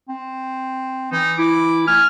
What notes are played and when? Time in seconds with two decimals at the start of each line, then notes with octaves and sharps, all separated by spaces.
0.09 C4
1.12 E3 D#4
1.39 E4 D6
1.87 A3 G#5 F6